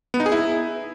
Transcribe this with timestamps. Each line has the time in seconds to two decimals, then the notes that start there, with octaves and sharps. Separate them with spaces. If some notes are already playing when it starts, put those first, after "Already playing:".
0.14 B3
0.20 D#4
0.26 G#4
0.32 E4